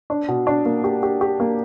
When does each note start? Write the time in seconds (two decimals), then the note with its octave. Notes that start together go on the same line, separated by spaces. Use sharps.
0.10 D4
0.28 B2
0.47 D4
0.65 A#3
0.84 G4
1.03 G4
1.21 G4
1.40 A#3